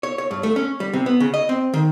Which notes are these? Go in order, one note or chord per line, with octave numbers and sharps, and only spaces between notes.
C#5
C#5
G2
A3
C#4
G3
C3
B3
C#3
D#5
C4
D#3